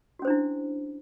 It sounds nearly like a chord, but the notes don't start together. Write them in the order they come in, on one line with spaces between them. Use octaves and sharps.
F#4 C#4 C5 D4 E4